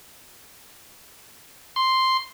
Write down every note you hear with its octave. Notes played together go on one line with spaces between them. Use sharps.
C6